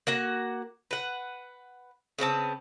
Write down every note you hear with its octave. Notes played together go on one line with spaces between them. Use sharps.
A#3 F#4 F#5
B4 F#5
C#3 B3 C4 A5